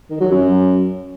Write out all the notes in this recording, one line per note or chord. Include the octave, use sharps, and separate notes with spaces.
D#3
F#3
F#2